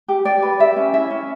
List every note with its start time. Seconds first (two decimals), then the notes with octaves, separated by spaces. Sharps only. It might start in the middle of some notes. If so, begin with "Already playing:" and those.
0.08 G4
0.25 G4 D5
0.42 B4
0.60 G4 E5
0.76 C#4
0.93 E4 E5
1.10 C#4